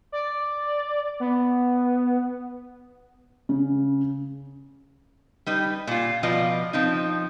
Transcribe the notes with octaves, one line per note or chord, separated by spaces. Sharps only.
D5
B3
C#3
G3 D#4 B4
A#2 F4
B2 F3 F4 B4 D5 D#5
F3 C4 D#4